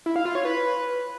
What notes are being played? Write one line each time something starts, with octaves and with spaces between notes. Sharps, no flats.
E4
F5
F4
C#5
B4